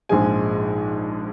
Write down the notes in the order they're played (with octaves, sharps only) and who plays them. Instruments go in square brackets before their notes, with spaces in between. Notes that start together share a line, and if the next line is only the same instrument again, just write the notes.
[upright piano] A#1 G#2 F3 G#3 G#5